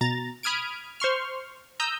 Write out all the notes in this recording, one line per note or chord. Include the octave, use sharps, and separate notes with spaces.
B2 A#5 A6
B5 D#6 F6 G#6 D7
C5 C6 C#6 F6
A#5 D#6 E6 G6